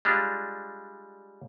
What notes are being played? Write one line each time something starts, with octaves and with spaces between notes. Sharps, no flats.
G3 G#3 D4 F4